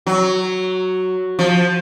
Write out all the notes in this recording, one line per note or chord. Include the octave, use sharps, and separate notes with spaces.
F#3
F3